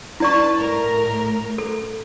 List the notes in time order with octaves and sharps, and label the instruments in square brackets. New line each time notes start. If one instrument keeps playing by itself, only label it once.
[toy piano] E4 D5 C#6 [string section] B4 A5
[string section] A2 A#4
[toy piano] A4